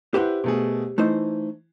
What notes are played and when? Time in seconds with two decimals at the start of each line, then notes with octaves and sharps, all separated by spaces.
0.14 E4 G4 B4 C5 F#5
0.44 B2 A3 G#4
0.98 E3 A3 D#4 C5